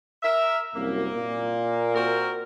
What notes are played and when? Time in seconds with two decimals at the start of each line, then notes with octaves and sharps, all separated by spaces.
0.23 A#4 E5
0.75 C2 F#2 A#3
1.14 A#2
1.94 C4 F#4 A#4